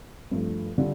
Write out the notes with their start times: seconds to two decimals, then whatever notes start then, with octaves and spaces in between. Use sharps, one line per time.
0.31 G2 F3 A3
0.78 D3 G3 D4 F4